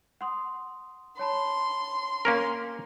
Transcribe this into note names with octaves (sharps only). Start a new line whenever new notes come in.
F#5 C6 D#6
C#5 A5 B5 C6
A#3 C#4 A#4